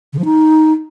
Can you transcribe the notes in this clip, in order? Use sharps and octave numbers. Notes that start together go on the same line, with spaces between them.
C#3
F3
D#4